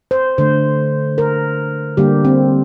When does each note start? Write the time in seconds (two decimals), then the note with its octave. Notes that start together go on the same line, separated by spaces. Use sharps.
0.11 C5
0.38 D3 A3 C5
1.18 A#4
1.97 D3 G3 A#3 G4
2.25 C4